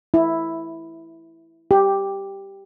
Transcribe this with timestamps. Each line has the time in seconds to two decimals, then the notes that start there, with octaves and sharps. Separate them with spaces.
0.14 E4
1.71 G4